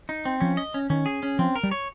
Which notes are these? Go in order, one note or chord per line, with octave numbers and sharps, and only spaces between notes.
D#4
C4
F3 C#4
D#5
C#4
D#3 C#4
G#4
C#4
F3 C4
A#4
G3
C#5